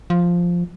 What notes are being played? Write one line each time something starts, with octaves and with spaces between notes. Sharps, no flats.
F3